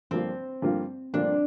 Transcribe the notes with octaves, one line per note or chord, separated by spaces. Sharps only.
G2 D3 F3 A#3 C4 F4
G2 D3 F3 A#3 F4
G2 D3 F3 A#3 D4 F4